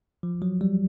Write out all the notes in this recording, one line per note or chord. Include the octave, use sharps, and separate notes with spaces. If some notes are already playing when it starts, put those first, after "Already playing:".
F3
F#3
G3